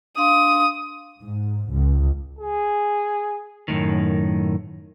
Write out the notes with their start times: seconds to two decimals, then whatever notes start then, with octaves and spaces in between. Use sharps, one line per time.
0.17 D4 F5 C6 D#6
1.21 G#2
1.72 C#2
2.39 G#4
3.68 F#2 A2 D#3